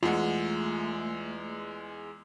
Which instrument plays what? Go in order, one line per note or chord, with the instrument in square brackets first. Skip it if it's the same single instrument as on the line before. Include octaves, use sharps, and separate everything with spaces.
[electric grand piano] E2 G#3 [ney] A3 [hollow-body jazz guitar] F4 F#5